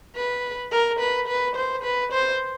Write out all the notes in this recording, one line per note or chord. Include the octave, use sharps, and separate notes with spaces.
B4
A#4
B4
B4
C5
B4
C5